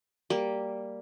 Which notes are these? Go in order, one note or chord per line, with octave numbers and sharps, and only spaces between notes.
G3 A#3